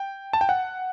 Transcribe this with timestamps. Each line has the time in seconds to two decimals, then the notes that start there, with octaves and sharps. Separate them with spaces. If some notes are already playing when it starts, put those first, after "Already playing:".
Already playing: G5
0.33 A5
0.41 G5
0.49 F#5